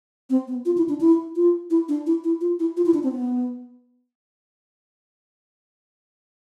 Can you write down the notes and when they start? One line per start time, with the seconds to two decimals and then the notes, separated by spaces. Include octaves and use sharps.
0.30 C4
0.48 B3
0.65 F4
0.77 E4
0.89 D4
1.01 E4
1.36 F4
1.70 E4
1.89 D4
2.06 E4
2.24 E4
2.41 F4
2.60 E4
2.77 F4
2.86 E4
2.94 D4
3.03 C4
3.12 B3